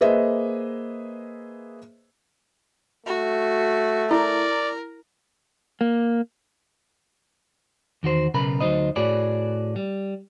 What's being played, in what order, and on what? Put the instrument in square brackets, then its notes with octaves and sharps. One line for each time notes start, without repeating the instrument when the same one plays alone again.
[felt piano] A#3 G#4 B4 C5 D#5 E5
[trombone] A3 [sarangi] F#4
[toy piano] E4 A#5 [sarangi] A#4 [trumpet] D5
[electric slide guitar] A#3
[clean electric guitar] E2 D#3 F#4 C5
B1 C#3 A#4 B4 B5
D2 F#3 D4 D#4 C5 D#5
A2 F#4 G#4 B4 C#5 D5
G3